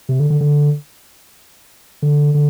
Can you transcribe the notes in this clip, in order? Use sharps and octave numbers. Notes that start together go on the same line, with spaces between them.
C3
D3
D3
D3
D3
D3